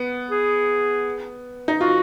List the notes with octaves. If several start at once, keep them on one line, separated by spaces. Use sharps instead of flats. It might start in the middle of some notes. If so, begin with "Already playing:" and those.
Already playing: B3
G#4
D#4
F4 F#4